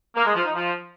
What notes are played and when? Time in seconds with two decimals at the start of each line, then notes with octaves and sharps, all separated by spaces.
0.16 A#3
0.25 G#3
0.35 F3
0.44 D#4
0.54 F3